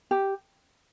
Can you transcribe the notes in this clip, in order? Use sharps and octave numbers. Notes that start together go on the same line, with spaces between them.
G4